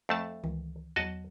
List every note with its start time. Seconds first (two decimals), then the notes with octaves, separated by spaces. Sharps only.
0.09 F2 A3 E5 A5
0.44 C#2 D#3 E3
0.96 E2 F#3 F#4 D#5 A5